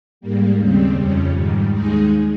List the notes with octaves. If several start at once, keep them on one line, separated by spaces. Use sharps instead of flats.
G#2 G3 A#3
D#2 C#3 G3 C4
F2 C#3 G3 C#4
G#2 D#3 G3
D#2 D#3 G#3 D#4 G#4